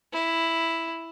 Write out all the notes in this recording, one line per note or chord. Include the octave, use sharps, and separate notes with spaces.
E4